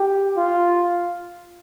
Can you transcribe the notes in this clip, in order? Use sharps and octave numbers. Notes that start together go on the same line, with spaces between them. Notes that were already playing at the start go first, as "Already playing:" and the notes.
Already playing: G4
F4